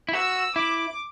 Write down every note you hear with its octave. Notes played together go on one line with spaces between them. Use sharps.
E4
F#4 E6
E4 D6